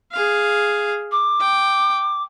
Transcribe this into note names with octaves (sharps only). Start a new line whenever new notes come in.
G#4 F5
D6
G5